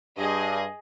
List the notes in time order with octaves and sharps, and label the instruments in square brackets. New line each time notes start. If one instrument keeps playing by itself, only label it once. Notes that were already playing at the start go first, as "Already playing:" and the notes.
[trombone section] G2 [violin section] G#4 D#5